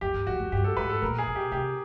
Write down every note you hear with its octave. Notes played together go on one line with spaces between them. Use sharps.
F#2 G4
G2
F2 F#4
F#2
G2 G4
A4
G#2 B4
A4
A#2 A#4
G#4
B2
G4
C3 G4